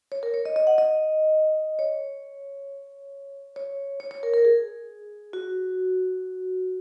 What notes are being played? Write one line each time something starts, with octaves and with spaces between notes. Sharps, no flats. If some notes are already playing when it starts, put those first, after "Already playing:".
C#5
A#4
C#5
D#5
D#5
F#5
D#5
C#5
C#5
C#5
C#5
A#4
A#4
G#4
F#4